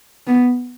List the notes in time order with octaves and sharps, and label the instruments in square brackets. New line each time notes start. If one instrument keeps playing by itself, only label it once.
[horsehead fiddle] B3